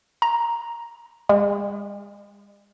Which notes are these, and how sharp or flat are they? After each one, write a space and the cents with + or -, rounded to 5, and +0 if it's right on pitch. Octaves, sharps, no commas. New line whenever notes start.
A#5 +5
G#3 -45